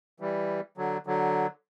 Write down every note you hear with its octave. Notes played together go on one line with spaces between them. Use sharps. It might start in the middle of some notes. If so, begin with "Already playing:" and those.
E3 G3
D3 F#3
D3 F#3